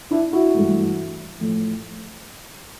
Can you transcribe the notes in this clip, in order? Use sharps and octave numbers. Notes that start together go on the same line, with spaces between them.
D4 E4
E4 F#4
G2 E3 A3
A2 F3 A3